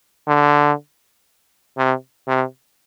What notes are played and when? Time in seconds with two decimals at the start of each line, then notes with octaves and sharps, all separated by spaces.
0.28 D3
1.78 C3
2.28 C3